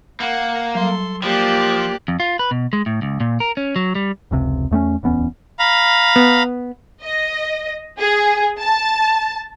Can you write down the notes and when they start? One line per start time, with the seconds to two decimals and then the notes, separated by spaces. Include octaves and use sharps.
0.20 A#3 F#5
0.75 F#3 G3 A4 C6
1.23 F3 A#3 G4 D5 F#6
2.08 F2
2.20 F4
2.39 B4
2.51 B2
2.73 G#3
2.86 A2
3.02 C#2
3.20 A#2
3.40 A#4
3.57 C#4
3.76 F#3
3.95 G3
4.31 F1 C#2 C3
4.71 E2 A3 B3 C#4
5.03 D1 E2 B3 C#4
5.59 F5 A#5 B5
6.16 B3
7.03 D#5
7.98 G#4
8.59 A5